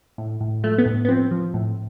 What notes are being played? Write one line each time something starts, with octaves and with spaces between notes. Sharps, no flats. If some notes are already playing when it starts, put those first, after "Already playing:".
A2
A2
F3 A3
B3
A2
B3
F3 C4
F3
A2